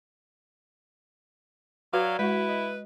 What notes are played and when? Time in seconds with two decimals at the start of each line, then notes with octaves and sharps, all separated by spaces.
1.93 F#3 F#4 B4 D5 F5 G#6
2.19 G#3 E4 F#4 B4 B6
2.49 D#5